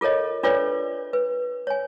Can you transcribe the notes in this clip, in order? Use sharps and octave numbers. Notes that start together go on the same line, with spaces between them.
F4 A4 A#4 C#5 D#5
D4 F4 A4 B4 C#5 D5
B4
C#5 G#5